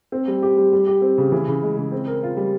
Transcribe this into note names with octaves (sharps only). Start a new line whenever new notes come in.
C4
G3
G4
G3
G3
G4
C4
C#3
E3
C#3
G#3
C#3
C4
A#4
F4
G3